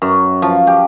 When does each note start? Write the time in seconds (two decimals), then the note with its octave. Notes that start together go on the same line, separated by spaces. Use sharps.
0.02 F#2
0.42 F3
0.67 G4